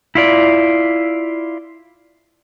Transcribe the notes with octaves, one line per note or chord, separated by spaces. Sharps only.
E4 F4 D5